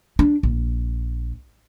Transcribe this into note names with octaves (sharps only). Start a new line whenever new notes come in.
D4
A#1